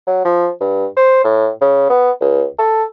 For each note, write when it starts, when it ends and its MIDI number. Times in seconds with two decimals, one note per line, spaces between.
0.07 0.23 54
0.25 0.49 53
0.61 0.86 43
0.97 1.20 72
1.24 1.49 45
1.61 1.88 49
1.90 2.11 59
2.21 2.44 37
2.59 2.84 69